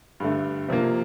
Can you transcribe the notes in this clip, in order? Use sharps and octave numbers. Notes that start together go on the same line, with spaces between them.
G2 D3 A3
C3 F3 A#3